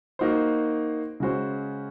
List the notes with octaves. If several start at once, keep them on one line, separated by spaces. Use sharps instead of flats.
A#3 D#4 F#4 C5
C#3 G#3 C#4 F#4 C5